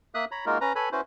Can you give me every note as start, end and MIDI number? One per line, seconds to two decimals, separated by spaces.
0.15 0.25 58
0.15 0.25 76
0.15 0.25 87
0.15 0.25 90
0.31 0.45 73
0.31 0.45 82
0.31 0.45 83
0.46 0.58 56
0.46 0.58 58
0.46 0.58 63
0.46 0.58 65
0.46 0.58 66
0.46 0.58 70
0.61 0.73 61
0.61 0.73 71
0.61 0.73 82
0.75 0.89 69
0.75 0.89 71
0.75 0.89 73
0.75 0.89 80
0.75 0.89 83
0.92 1.01 61
0.92 1.01 64
0.92 1.01 66
0.92 1.01 71
0.92 1.01 72